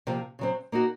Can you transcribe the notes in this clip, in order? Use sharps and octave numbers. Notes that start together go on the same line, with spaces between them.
C3 F3 A#3 F4
C#3 F#3 C4
A#3 D#4 F#4